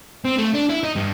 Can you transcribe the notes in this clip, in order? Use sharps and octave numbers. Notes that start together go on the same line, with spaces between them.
C4
A3
D4
E4
D#4
G2